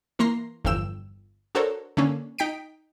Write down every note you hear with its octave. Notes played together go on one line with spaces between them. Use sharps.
E3 A#3 A#5 C6 A#6 C7
G1 E2 F3 G5 E6 E7
D4 F#4 A4 A#4 C5 C#5
D3 A#3 C#4 D4
D#4 G5 B6 D7